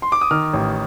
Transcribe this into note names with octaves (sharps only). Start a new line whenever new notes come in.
C6
D6
D#6
D#3 F6
A1